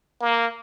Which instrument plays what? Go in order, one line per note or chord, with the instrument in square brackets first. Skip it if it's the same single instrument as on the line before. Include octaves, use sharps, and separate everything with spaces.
[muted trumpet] A#3